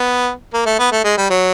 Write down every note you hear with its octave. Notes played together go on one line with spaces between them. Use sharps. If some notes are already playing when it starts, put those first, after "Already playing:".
Already playing: B3
A#3
A3
B3
A3
G#3
G3
F#3